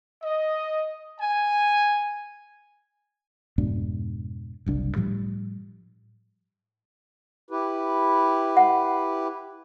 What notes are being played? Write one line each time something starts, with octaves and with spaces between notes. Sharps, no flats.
D#5
G#5
F2 G#2 B2 D4
F#1 C2 D4
A2 F3 G3
E4 G4 B4
F#5